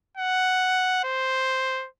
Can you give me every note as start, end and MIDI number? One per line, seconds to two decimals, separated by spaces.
0.17 0.99 78
1.04 1.87 72